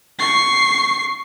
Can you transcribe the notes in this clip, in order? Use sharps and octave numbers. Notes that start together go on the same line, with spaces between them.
C#6 C7